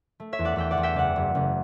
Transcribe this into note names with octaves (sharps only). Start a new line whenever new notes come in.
A3
C#5 E5
E2
D5 F#5
E2 E5 G5
D5 F#5
E2
E5 G5
F#1 D5 F#5
F#1
F#1